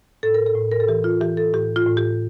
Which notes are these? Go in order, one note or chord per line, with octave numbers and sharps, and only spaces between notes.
A2 A4
A#4
A4
A2
A#4
A4
E3 G4
F4
E3 G4
A4
A2 G4
F4
A2
G4